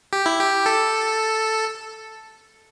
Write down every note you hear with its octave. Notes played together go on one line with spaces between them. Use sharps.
G4
E4
G4
A4